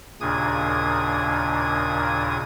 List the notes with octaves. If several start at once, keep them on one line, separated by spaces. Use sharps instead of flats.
D#2 A#2 C#3 D4 D#6 G#6